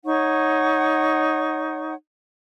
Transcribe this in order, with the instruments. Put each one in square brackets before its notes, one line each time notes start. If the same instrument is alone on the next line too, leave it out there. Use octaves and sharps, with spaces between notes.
[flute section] D#4 C#5 F#5 C#6